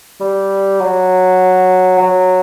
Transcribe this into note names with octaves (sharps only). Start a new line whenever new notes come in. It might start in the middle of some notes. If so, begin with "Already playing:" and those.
G3
F#3
F#3